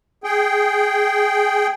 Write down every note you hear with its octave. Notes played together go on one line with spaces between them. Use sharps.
G#4 G5